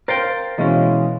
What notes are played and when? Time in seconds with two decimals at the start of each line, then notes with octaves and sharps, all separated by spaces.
0.08 A#4 C5 F5 G5 A6
0.58 B2 E3 G#3 C#4 D#5 F5